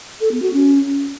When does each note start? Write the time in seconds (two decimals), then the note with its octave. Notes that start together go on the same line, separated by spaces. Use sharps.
0.21 A4
0.31 B3
0.42 F#4
0.53 C#4